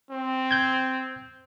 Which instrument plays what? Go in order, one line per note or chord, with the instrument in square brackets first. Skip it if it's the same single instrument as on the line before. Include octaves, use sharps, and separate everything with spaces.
[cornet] C4
[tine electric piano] G6 G#6